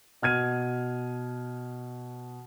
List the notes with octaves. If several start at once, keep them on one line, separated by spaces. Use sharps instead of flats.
B2 F6 G#6 D#7